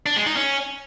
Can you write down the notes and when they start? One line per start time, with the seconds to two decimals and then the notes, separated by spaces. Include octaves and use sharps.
0.06 D4
0.16 G#3
0.26 D#4
0.37 C#4